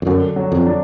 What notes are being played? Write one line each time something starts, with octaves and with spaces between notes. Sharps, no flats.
F2
F#2 D3
F#3
F2
D4